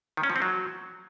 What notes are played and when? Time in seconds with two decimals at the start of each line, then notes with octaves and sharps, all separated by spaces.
0.17 D#3
0.23 C#4
0.30 F3
0.36 C4
0.42 F#3